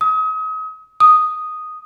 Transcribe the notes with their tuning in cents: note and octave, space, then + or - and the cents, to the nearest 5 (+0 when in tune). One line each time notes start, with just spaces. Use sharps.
D#6 +35
D#6 +0